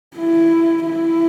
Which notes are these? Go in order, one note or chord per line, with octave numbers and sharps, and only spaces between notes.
E4
E4